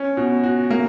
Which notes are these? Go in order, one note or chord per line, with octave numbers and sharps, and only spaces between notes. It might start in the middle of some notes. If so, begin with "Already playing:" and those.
Already playing: C#4
B2
F#4
A#3